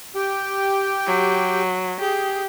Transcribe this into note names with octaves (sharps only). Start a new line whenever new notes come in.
G4 G5
F#3
G4 G#4